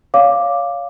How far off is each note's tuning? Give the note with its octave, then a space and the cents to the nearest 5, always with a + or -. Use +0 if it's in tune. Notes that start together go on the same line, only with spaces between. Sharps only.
C#5 +25 F5 +0 D6 +0